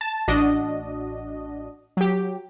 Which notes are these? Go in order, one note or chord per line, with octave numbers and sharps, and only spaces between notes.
A5
A1 D4 F#4 D#5
F#3 G4